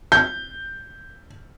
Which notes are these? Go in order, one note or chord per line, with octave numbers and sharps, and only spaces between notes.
G6